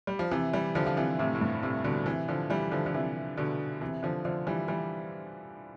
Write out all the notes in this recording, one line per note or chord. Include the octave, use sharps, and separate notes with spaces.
G3
F3
C3 E3
E3 G3
D3 F3
F3
C3 E3
A2 C3
A2
G2
A2 C3
B2 D3
C3 E3
D3 F3
E3 G3
D3 F3
D3
C3 E3
B2 D3
C3 E3
D3 F3
D3 F3
E3 G3
E3 G3